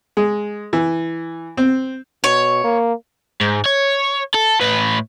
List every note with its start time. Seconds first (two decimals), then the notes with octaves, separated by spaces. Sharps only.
0.17 G#3
0.73 E3
1.57 C4
2.24 B2 C#5
2.64 A#3
3.41 G#2
3.65 C#5
4.35 A4
4.61 A2 B4